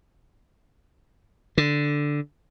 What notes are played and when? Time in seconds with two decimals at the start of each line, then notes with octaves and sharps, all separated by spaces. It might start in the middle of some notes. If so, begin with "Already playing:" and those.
1.58 D3